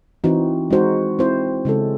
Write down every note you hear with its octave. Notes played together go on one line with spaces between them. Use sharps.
E3 C4 D#4 F#4
G#3 D#4 F#4 C5
C4 E4 C5
C#3 G#3 C#4 E4 A4